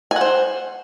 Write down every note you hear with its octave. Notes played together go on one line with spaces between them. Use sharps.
C5 F#5 G#5